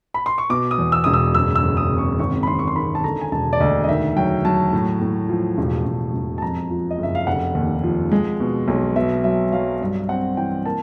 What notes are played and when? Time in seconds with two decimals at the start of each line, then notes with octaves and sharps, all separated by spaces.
0.14 B5
0.26 C6
0.38 C#6
0.50 B2 D6
0.71 D#6
0.78 E2
0.92 E6
1.04 E1 D#6
1.14 E6
1.35 F#1 E6
1.55 E6
1.63 F#1
1.77 D#6
1.91 C3
1.98 C#6
2.19 G#1 C#6
2.43 B5
2.47 G#1 C6
2.59 C#6
2.68 C6
2.76 D#3 B5
2.95 A5
3.04 D3 A#5
3.21 G#5
3.32 E1 A5
3.53 D5
3.60 D2 D#5
3.84 D#5
3.88 D#3 E5
4.16 F#3 G5
4.45 F#3 A5
4.73 A2
5.01 A2
5.29 F3
5.58 E1
5.85 E1
6.14 E1
6.38 A5
6.42 F2 A#5
6.70 F3
6.91 D#5
6.99 F#1 E5
7.15 F5
7.27 F1 F#5
7.55 D#2
7.83 F3
8.12 G#3
8.40 B2
8.68 B1
8.96 B2 E5
9.24 F#3 E5
9.52 F#3 F5
9.81 G2
10.09 C4 F#5
10.37 E3 G5
10.65 A#3 A5